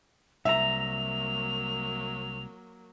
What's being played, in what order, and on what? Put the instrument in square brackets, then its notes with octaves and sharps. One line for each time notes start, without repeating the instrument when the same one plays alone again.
[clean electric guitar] C2 A#5 [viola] F#3 A#3 [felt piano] E5 [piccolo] F7